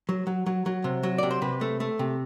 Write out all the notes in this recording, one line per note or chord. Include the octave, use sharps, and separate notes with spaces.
F#3
F#3
F#3
F#3
C3
F#3
C3 D5
C5
C3 B4
A3
A3
C3